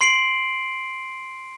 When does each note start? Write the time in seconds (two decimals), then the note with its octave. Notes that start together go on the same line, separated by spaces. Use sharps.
0.01 C6 C7 D7 F#7